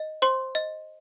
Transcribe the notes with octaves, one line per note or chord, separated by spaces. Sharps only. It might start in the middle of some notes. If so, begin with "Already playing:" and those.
Already playing: D#5
C5 C6
D#5